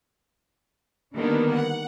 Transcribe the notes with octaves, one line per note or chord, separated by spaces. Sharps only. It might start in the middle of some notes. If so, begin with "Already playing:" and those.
D3 D#3 G3 A#3 B3 D4
F#5